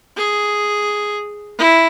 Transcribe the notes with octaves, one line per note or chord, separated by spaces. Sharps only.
G#4
E4